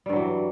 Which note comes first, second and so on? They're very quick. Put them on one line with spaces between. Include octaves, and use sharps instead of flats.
G3 G2 F#3 E3